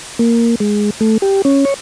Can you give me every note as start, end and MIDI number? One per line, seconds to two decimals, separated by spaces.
0.19 0.55 58
0.60 0.90 56
1.01 1.18 57
1.22 1.42 67
1.45 1.65 61
1.65 1.74 73